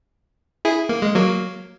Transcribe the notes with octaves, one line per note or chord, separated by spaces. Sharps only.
E4 G#4
A#3
G#3
F#3 A#3